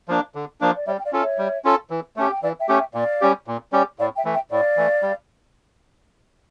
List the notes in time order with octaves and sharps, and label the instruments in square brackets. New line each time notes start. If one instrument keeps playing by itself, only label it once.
[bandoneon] F3 A#3 D4
D3
F3 A#3 D4
[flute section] D5
[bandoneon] G3 [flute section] C#5 E5
[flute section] G5
D5 F5
[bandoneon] C#4 F4 A4
[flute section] C#5 E5
[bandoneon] G3
C#4 F4 A4
E3
[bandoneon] A3 C#4 G4 [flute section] A5
[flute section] G5
[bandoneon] E3 [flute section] D5 F5
[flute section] E5 G5
[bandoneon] A3 C#4 G4
[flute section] E5 G5
[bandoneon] A#2 [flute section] D5 F5
[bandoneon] G3 C#4 G4
A#2
G3 C#4 G4
[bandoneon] A2 [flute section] D5 F5
[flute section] E5 G5
[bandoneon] E3 A3
[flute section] E5 G5
[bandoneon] A2 [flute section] D5 F5
[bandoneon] E3 A3
G3